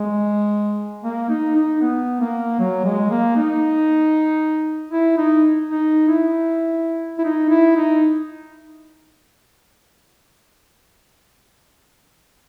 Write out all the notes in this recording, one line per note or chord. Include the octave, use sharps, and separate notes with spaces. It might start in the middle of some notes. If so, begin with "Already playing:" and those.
Already playing: G#3
A#3
D#4
D#4
B3
A#3
F#3
G#3
A#3
D#4
E4
D#4
D#4
E4
E4
D#4
E4
D#4